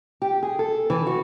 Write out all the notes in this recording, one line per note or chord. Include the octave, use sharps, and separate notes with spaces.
G4
G#4
A4
E3
F#4